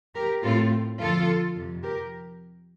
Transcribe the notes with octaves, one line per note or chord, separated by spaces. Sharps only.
G4 A#4
A2 A3 C4 F4 A4
F2 D3 F3 F4 A4
F2 C3 F3
G4 A#4